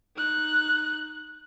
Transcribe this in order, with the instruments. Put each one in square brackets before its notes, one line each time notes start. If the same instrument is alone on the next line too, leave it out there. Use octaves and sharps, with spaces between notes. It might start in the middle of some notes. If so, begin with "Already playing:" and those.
[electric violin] D#4 F#6